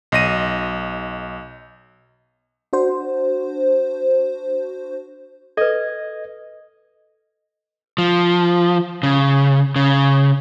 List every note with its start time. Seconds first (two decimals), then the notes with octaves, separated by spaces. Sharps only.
0.12 B1 D#5 A#6 D#7
2.73 D4 F#4 C5
5.57 A4 B4 D#5 G#6
7.98 F3
9.03 C#3
9.76 C#3